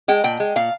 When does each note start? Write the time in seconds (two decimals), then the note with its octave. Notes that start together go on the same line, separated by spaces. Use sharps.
0.08 G#3 G5
0.24 A#2 G5
0.40 G#3
0.56 A#2 F5